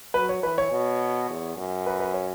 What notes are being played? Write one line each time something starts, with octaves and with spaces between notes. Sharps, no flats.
F#3 B4
C#5
E3 B4
C#5
B2
E2
F#2
B4
B4
C#5